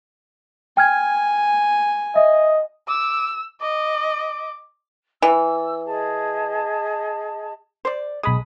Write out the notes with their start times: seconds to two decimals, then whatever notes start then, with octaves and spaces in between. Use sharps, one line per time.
0.77 G5 G#5 F6 G#6
2.16 D#5 E5
2.88 D6 E6
3.61 D#5 D6
5.22 E3 E6
5.86 G#4 D#5 A5
7.85 C5 D5
8.23 B1 G#3 B5 D#6